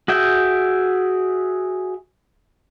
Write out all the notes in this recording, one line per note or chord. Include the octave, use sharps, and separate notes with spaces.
F#4 G#4 E5 G5